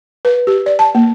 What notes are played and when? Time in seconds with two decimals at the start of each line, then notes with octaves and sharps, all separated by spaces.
0.25 B4
0.47 G4
0.66 D5
0.79 A5
0.95 A#3